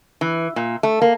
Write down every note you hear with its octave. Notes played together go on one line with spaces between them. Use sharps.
E3
A#2
A3
A#3